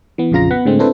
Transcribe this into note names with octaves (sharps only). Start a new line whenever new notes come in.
E3 B3
A#1 F2 C#3 F4 A#5 A#6
B3 F#5 B5
A2 D3 G#3 C4
C4 D4 E4 A4 B4 C5